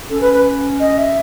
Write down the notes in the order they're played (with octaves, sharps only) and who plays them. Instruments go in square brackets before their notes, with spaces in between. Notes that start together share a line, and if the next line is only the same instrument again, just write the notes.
[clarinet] C#4 [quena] A4
[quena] B4
B4
D#5
E5